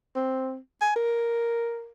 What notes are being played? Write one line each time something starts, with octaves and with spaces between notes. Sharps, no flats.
C4
G#5
A#4